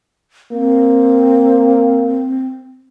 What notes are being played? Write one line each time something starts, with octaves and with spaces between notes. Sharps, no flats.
A#3 C4